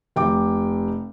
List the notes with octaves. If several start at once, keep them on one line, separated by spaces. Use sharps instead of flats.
F1 G5 D6